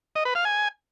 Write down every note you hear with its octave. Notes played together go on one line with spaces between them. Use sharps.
D#5
B4
F5
G#5